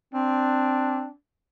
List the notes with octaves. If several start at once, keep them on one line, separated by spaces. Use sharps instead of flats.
C4 D4